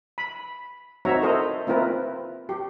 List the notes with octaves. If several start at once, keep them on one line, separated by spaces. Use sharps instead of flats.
B5
C4 D#4 F#4 C#5 E5 A#5
E4 A4 A#4 C5 D#5 A#5
A#3 C4 E4 F4 A#4 B4
G4